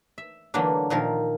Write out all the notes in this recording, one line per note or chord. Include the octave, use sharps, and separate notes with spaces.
E5
D3 E3 F#3 A3 A#3 D4
A#2 D#3 F3 A#4